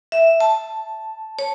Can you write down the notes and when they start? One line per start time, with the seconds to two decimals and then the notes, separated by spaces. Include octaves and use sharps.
0.12 E5
0.40 A5
1.39 C#5